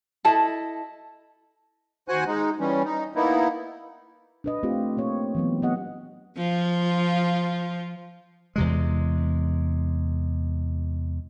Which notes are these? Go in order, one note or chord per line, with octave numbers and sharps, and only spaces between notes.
E4 A4 D#5 A5
D#2 F#4 C5 F#5 G#5 F#6
G#3 D#4
E3 G3 C#4
D#4
A#3 B3 D#4 E4
D4 B4 D#5
A3 C4 F4 G4
A#3 G4 C#5
E3 F#3 B3
B3 G4 D#5 F#5
F3 F4
E2 C3 G#3